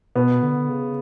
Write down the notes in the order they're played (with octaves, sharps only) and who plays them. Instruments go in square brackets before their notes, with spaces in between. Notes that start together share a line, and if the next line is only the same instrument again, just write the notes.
[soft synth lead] B2 [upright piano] B3
[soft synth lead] D3
C#3